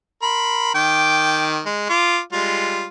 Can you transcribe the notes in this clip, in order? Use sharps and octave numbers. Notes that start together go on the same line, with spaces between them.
A#4 B5 C6
D#3 G5 D6
G#3
F4 D6
G3 G#3 F4